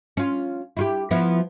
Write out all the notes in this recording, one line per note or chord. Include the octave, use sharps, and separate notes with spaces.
C#4 F4
E4 F4 G4
F3 B3 E4